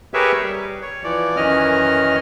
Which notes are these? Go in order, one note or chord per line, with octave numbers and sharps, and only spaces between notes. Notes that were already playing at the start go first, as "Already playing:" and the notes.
G4 G#4 A#4 B4 C#5 E5
G3
C#5
E3 F3 D5
F#2 D#3 E3 C#4 D#5 F6